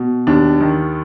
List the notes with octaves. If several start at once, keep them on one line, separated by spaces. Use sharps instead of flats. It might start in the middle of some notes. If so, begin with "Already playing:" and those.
Already playing: B2
D#2 D4
D#3